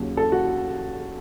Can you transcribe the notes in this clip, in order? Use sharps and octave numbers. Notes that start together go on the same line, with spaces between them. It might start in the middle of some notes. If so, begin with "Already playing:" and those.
Already playing: D#2 C#3 F#3
A4
F#4